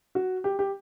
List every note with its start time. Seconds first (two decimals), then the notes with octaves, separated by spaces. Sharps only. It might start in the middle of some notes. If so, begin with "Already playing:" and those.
0.15 F#4
0.44 G4
0.59 G4